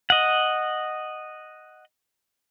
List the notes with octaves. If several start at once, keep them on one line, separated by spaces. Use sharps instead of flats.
D#5 F#5